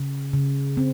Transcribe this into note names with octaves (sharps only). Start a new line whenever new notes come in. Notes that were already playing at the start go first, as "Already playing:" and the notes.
Already playing: C#3
C#3
C4